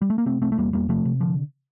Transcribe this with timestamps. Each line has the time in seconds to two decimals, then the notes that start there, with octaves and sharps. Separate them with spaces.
0.02 G3
0.10 A3
0.18 A#3
0.26 C3 A3 C4
0.42 C2 A3 C4
0.52 A3
0.58 E2 G3 A#3
0.73 E2 G3 A#3
0.89 C3 F3 A3
1.05 C3
1.20 D3 F3